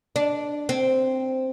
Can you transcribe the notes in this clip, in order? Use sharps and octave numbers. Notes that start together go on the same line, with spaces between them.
D4
C4